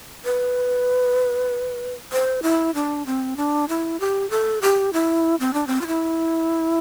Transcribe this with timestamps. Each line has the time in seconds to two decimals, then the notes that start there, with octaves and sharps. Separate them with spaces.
0.25 B4
2.12 C5
2.43 E4
2.75 D4
3.06 C4
3.37 D4
3.69 E4
4.00 G4
4.30 A4
4.62 G4
4.93 E4
5.40 C4
5.54 D4
5.67 C4
5.82 F4
5.87 E4